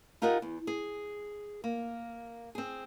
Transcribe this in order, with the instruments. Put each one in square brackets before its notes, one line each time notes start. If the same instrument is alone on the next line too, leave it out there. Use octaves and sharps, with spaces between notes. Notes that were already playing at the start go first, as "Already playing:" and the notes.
[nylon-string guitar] D#4 F4 G4 A#4 D#5 F#5
E2
G#4
A#3
C4 G#4